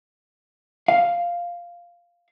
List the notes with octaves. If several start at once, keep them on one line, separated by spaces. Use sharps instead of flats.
F5